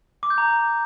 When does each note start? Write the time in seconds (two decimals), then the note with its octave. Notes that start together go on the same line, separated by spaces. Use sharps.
0.23 D6
0.30 G6
0.38 A#5